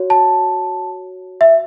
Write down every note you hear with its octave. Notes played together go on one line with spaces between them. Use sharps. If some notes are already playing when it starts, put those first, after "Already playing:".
Already playing: F#4 C#5
A5
E5